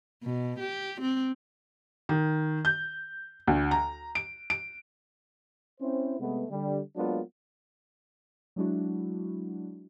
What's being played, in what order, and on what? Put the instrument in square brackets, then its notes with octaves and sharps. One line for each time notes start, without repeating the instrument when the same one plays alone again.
[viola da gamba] B2
G4
C4
[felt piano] D#3
G6
D2
A#5
D7
D7
[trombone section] C4 C#4 E4 C5
C3 G#3 A3 B3
D3 G3
F#3 G#3 A#3 B3 D4 F4
[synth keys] F#3 G#3 D4 E4 F#4